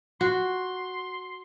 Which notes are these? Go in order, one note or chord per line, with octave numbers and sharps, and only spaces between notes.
F#4 C6